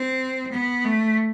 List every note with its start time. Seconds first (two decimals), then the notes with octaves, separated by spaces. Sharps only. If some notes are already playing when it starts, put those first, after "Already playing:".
Already playing: C4
0.52 B3
0.85 A3